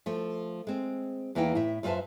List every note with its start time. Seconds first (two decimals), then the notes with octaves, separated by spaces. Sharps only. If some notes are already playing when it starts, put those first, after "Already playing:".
0.06 F3 A3
0.67 G#3 C4
1.35 E2 E3 A#3 D#4 E4 G5
1.55 A2 E5
1.83 F#2 F4 B4 C5 E5 A5